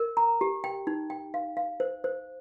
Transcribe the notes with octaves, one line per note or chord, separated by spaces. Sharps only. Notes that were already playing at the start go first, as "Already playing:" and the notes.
Already playing: A#4
A#5
G4
G5
D#4
G5
F5
F5
C5
C5